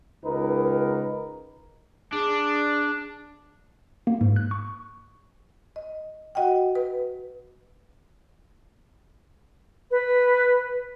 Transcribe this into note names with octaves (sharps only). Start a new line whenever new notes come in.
C#2 D#4 A#4 B4
D4 G#4
A#3
G#2
F#6
C#6
D#5
F#4 D#5 F#5 G5
B4
B4